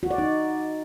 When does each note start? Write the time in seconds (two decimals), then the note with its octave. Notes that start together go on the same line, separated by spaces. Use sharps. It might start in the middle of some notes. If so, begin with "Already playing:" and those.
0.03 F#4
0.11 D5
0.18 D#4